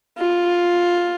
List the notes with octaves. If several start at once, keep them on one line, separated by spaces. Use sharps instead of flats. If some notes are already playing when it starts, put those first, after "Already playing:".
F4